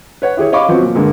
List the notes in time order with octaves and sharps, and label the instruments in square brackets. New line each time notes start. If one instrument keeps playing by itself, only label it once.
[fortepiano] B4 C#5 F#5
E4 G4 G#4 C#5
C#5 D#5 F5 B5 C#6 D6
F3 B3 C4 F#4
A#2
G2 D3 G#3 A#3